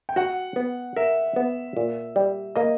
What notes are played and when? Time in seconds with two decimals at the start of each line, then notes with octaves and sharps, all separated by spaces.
0.09 G5
0.16 F#4 F#5
0.56 B3
0.96 A#4 E5
1.36 B3
1.77 A#2
2.16 G3
2.55 A#3 D#5